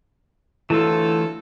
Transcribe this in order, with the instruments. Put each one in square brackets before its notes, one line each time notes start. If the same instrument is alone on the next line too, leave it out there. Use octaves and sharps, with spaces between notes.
[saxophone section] D2 F#3 A4 [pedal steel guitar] E3 A3 F4 [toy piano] E4